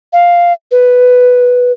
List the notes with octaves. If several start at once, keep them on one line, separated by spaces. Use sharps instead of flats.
F5
B4